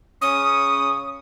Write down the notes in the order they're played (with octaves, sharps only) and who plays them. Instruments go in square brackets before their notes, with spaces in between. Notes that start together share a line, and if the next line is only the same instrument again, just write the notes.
[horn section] C#3 C#4 [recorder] D#6